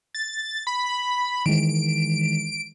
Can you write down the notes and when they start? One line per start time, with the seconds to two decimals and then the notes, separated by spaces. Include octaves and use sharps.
0.14 A6
0.67 B5
1.46 D#3 E3 G#3 D7